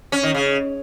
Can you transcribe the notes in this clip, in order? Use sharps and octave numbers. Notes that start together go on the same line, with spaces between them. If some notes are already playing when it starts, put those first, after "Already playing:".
C#4
D#3
C#3